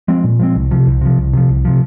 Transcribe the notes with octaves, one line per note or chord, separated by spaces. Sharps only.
F3 G#3 C4
A#2
F3 G#3 C4
C2
C3 F3
C2
C3 F3
C2
C3 F3
C2
C3 F3